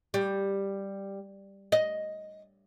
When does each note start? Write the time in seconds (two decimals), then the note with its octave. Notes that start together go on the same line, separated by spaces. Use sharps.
0.14 G3
1.72 D#5